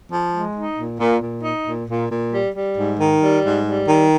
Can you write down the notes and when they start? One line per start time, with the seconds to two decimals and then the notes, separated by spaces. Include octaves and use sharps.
0.11 F3
0.33 G#3
0.55 D#4
0.77 A#2
1.00 A#2
1.22 A#2
1.44 D#4
1.66 A#2
1.89 A#2
2.10 A#2
2.33 G3
2.55 G3
2.77 G#2
3.00 D#3
3.21 G3
3.44 G#2
3.66 G3
3.88 D#3